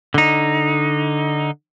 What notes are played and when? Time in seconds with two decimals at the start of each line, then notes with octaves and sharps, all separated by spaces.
0.14 D3 D#4